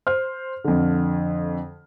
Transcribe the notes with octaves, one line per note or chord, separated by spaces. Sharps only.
C5 F6
F2 D3